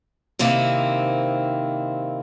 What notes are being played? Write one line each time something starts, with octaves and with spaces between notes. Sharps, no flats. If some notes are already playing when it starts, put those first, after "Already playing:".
C3 D#3 A#3 C4 E4